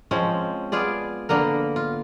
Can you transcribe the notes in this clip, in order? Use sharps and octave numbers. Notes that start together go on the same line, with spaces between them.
F3 G#3 C4 C#4
B3 F4 G#4 D5
D3 A#3 B3 A#4
F4